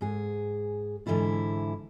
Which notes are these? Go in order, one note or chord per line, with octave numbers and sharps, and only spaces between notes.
G#2 G#4
G#2 D3 E3 E4 F4